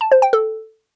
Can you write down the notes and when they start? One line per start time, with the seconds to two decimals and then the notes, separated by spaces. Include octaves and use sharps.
0.01 A5
0.12 C5
0.22 G5
0.33 A4